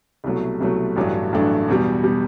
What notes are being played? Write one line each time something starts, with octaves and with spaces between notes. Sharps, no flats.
C2 B2 F#3 A3
C2 B2 F#3 A3
A1 G2 F#3 A3 D4
A1 G2 F#3 A3 D4
E2 B2 G3
B2 G3